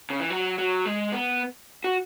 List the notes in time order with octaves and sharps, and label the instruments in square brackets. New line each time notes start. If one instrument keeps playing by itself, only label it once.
[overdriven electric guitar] C#3
E3
F#3
F#3
G#3
B3
F#4